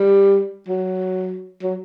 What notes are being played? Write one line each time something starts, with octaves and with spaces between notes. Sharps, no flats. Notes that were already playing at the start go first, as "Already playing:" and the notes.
Already playing: G3
F#3
F#3